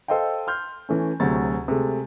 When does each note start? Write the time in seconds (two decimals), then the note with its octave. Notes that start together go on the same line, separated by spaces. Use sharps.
0.08 A4 C5 D#5 F5 G5
0.47 C6 F6 G6
0.89 E3 A3 C#4
1.20 D2 C3 F#3 G#4 A6
1.68 C3 G#3 A3